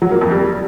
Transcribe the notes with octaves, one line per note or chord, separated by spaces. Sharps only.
F#3
A#3
F2
G3